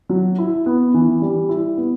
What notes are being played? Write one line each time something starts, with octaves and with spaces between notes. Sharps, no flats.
F#3
E4
B3
E3
G3
E4
B3